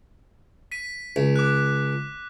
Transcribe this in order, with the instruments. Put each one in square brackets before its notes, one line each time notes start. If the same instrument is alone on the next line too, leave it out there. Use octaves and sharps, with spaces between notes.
[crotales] B6 D#7
[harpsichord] C#2
[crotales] D6 F#6